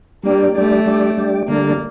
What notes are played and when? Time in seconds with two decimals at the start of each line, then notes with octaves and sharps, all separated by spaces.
0.23 G3 A#3 D4 G4 D5
0.55 G3 A3 D4 G4 D5
0.86 G3 D4 G4 D5
1.17 G3 D4 G4 D5
1.48 D3 G3 A#3 D4 A4